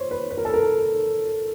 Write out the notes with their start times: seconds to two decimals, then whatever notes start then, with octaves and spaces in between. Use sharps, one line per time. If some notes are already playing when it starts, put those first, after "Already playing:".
Already playing: C5 C#5
0.11 B4
0.31 B4
0.38 A#4
0.45 A4
0.54 A#4